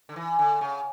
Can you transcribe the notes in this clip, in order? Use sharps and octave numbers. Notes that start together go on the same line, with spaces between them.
D3
E3
D3
C#3